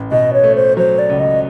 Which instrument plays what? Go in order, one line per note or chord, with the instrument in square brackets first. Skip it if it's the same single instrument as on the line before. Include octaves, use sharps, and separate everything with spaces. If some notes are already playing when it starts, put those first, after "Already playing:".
Already playing: [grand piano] A1
[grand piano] B2 [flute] D#5
[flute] C#5
[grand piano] A3
[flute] C5
[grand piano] F#3 [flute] C5
[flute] D5
[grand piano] C#2
[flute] D#5